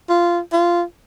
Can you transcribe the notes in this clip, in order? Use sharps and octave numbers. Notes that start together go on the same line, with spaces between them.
F4
F4